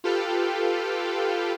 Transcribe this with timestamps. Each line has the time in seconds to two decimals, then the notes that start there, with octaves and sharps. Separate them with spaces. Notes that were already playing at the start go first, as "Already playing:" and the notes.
0.04 F4 G4 A4 B4 F5 G5